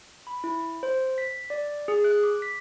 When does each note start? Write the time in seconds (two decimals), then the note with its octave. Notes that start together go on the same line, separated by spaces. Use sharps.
0.27 B5
0.44 E4
0.83 C5
1.18 B6
1.50 D5
1.88 G#4
2.04 F#6
2.23 D6
2.42 B6